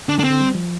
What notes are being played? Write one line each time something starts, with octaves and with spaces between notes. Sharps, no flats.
D3 D4
D3 D4
C4
D3
G3
F3